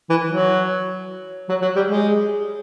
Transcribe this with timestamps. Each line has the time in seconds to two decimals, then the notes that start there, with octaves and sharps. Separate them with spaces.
0.10 E3
0.27 F#3
1.49 F#3
1.62 F#3
1.76 G3
1.89 G#3